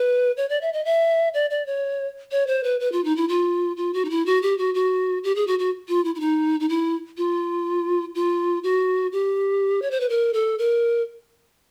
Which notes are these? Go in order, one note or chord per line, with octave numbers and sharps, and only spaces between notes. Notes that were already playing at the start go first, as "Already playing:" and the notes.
Already playing: B4
C#5
D5
E5
D#5
E5
D5
D5
C#5
C#5
C5
B4
B4
F4
D#4
E4
F4
F4
F#4
D#4
E4
F#4
G4
F#4
F#4
G4
G#4
F#4
F#4
F4
E4
E4
D#4
D#4
E4
F4
F4
F#4
G4
C#5
C5
B4
A#4
A4
A#4